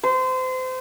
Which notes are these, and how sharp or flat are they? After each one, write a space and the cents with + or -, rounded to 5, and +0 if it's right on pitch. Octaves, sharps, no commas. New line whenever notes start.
C5 -30